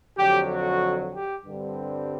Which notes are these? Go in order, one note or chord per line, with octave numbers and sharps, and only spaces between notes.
F2 D3 F#3 G4
F#4
G4
G2 D3 G3 C4